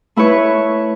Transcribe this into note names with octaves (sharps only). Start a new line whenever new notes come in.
A3 E4 B4 C#5